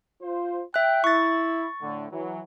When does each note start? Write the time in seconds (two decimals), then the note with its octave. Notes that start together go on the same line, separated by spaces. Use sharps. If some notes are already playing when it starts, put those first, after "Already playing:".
0.21 F4 C5
0.74 E5 G5 F#6
1.04 E4 C#6 A6
1.80 A2 D3
2.12 E3 F#3